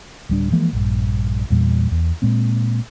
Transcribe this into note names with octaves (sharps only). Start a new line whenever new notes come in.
D1 G3 D4
E3 F3 G#3 A#3
A#1 G2
E2 A#2 G3
E2
A#2 G#3 C4